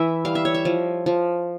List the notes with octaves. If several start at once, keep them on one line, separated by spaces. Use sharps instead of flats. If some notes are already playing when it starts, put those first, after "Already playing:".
Already playing: E3 E5
G3 F5
E5
C#5
E5
F3
F3